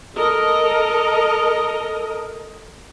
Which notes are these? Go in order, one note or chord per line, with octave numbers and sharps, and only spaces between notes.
A4 A#4 D#5